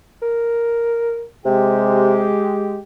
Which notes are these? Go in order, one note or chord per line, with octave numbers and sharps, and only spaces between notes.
A#4
C3 G#3 G4